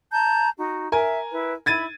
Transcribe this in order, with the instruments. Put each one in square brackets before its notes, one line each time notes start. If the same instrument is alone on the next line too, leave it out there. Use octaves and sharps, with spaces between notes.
[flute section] A5 A#5 G6
D#4 F#4
[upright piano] A#4 G#5 [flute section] E5
[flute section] E4 B4
[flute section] E4 B5 [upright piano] G#6 A6 D#7